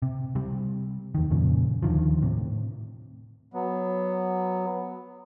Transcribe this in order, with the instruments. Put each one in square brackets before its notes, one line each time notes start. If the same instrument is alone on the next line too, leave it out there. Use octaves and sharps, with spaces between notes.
[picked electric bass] C3
C3 G3
E2 D#3
F2 A#2 C#3
D#2 D3 D#3 F3
A2 C3
[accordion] F#3 B3